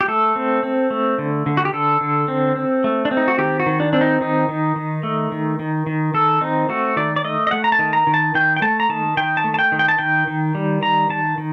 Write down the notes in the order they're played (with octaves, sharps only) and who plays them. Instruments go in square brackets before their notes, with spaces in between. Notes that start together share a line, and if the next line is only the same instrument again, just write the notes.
[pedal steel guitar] G4
A3 A4
C4
C4
A3
D3
D3
F#4
G4
D3 A4
D3
C4
C4
A3
D4
C4
D#4
F#4
D#3 G4
F#4
D#3
D4
C4 D4
D#4
D#3 D#4
D#3
D#3
A3
D#3
D#3
D#3
D#3 A4
C4 D#4
A3 F#4
D#3 D5
D5
A3 D#5
D#5
A3 F#5
A#5
A5
D#3
A#5
D#3
A5
D#3 G5
G5
A3 A5
A#5
D#3 A5
D#3 G5
A5
A3
A5
G5
D#3
G5
A5
D#3 G5
D#3
G3
D#3 A#5
D#3 A5
D#3